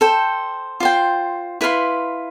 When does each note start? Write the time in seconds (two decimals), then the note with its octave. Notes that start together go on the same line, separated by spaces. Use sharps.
0.01 A4 C5 G5
0.80 F4 C5 G5
1.61 E4 B4 F5 C6